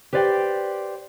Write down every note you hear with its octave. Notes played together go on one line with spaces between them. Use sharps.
G4 B4 C5 D5 F5 G5